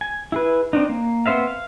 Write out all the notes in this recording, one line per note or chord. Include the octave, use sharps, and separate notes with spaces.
G#5
E4 G#4 B4
C4 D4 D#4
A#3
B3 C4 C5 E5 F5
F5